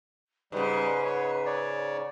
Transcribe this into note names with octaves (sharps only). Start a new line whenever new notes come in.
G#2 C#3 G3 B4
C#5
C#5 D5